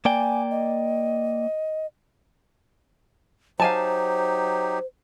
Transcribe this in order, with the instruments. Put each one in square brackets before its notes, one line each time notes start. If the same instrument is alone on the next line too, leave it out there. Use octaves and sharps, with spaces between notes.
[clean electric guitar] A#3 D5 G5 [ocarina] G#5
[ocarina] D#5
[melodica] F#3 D#4 G4 [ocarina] C5 [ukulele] F5 G#5 A5